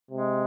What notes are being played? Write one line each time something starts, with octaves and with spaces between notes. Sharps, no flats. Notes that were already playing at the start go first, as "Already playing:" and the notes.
C3 G#3